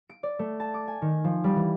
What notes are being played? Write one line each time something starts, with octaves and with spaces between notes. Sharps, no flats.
D7
D5
A3
A5
D6
G#5
D#3
F3
G3
E3